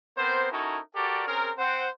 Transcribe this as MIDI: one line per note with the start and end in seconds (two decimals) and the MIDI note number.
0.18 0.51 59
0.18 0.51 60
0.18 0.51 70
0.18 0.51 72
0.52 0.79 61
0.52 0.79 63
0.52 0.79 64
0.52 0.79 66
0.52 0.79 69
0.52 0.79 70
0.95 1.24 66
0.95 1.24 67
0.95 1.24 69
0.95 1.24 70
0.95 1.24 74
1.27 1.52 60
1.27 1.52 61
1.27 1.52 68
1.27 1.52 70
1.58 1.89 60
1.58 1.89 72
1.58 1.89 78